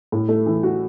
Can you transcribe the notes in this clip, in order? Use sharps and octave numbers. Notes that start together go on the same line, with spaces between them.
A2
A3
E3
F#4